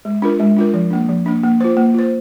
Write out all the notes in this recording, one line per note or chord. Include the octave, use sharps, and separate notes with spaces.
G#3
D4 F4 A#4
G#3
D4 F4 A#4
F3
A#3 D4
F3
A#3 D4
A#3
F4 C5
A#3
F4 C5